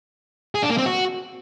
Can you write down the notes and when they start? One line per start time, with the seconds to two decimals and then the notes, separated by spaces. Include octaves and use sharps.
0.55 G#4
0.63 D4
0.70 A#3
0.78 C4
0.86 F#4